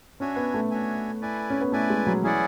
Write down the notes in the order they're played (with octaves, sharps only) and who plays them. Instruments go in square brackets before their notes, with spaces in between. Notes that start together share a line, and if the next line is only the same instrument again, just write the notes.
[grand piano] C#4 [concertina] D4 F#4 C#5 E5 G#5
[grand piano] B3
A3
[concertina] D4 F#4 C#5 E5 G#5
E4 B4 D5 G#5
[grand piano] C#4
B3
[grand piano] A3 [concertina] E4 B4 D5 G#5
[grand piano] G#3
F#3
[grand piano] E3 [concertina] C#4 E4 G#4 D5 F#5